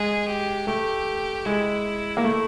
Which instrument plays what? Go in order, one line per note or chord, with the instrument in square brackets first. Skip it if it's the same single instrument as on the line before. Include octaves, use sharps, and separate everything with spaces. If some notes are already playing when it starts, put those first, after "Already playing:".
Already playing: [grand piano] G#3 [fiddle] G#4
[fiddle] G4
[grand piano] A3 [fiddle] G4
[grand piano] G#3 [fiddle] E4
[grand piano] A#3
A3